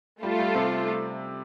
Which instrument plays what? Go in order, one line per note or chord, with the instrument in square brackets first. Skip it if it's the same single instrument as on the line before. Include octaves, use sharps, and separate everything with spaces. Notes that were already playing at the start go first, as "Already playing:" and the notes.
[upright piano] G3 [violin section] A3 F4 A4
[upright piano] G3
C3 C4